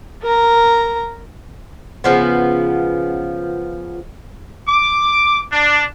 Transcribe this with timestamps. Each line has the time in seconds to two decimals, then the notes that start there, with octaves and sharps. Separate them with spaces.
0.23 A#4 A#5
2.04 C#3 F3 B3
4.68 D6
5.52 D4